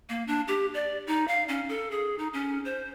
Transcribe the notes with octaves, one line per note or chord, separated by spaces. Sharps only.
A#3
D4
G4
D5
D#4
F5
C#4
A4
G#4
D#4
C#4
C5